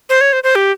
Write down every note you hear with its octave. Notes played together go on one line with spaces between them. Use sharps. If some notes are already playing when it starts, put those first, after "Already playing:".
C5
C#5
C5
C5
G4